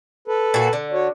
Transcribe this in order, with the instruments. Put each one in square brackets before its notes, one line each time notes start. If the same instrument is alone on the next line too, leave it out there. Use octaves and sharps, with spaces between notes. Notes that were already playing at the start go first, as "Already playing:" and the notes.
[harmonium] A4 B4
[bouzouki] A#2 F#4
D3
[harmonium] F#4 C#5